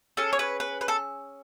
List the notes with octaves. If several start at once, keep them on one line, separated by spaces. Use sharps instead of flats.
C#4 G#4 A4
C#5
B4
B4
B4
A4